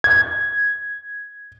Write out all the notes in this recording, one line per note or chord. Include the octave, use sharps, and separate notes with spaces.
G#6